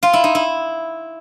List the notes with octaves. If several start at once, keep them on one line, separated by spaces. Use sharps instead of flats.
F4
E4
D#4
E4